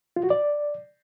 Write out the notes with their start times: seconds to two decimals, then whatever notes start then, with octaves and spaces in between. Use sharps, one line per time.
0.16 F4
0.23 F#4
0.30 D5